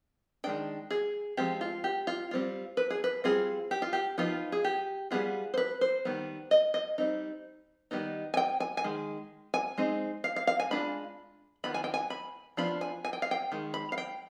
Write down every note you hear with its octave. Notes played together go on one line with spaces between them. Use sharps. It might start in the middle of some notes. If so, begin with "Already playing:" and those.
D#3 G#3 D4 G5
G#4
F3 G#3 C4 F4 G4
F4
G4
F4
G3 C4 F4
B4
G#4
B4
G3 C4 F4 G#4
G4
F4
G4
F3 B3 D#4 F4
G#4
G4
G3 B3 F4 G#4
C5
B4
C5
D#3 G3 B3
D#5
D#5
G3 C4 D#4
D#3 G3 B3 D#4
G#5
G5
G#5
G#5
D#3 G#3
G#5
G#3 C4 D#4
F5
F5
F5
G#5
G#3 D4 F4 B5
D#3 B3 F4 B5
G#5
G5
G#5
B5
F3 B3 D4 F4 B5
G#5
G#5
G5
F5
G5
D#3 G#3
B5
F5
G5